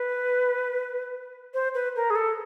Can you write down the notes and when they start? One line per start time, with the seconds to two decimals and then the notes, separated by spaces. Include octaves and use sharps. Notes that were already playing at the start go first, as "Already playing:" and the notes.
Already playing: B4
1.54 C5
1.74 B4
1.96 A#4
2.10 G#4
2.15 A4